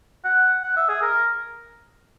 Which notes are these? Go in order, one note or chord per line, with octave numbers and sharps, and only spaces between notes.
F#5
F#5
E5
G#4
A#4